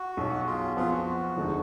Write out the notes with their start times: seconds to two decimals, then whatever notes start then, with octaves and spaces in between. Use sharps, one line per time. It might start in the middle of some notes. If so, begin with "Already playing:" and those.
Already playing: F#4
0.17 B1 B2 F#3
0.46 F4 G#4
0.76 F2 F3 B3 F4 G#4
0.92 F#4
1.37 F1 D#2 D3 G#3 D#4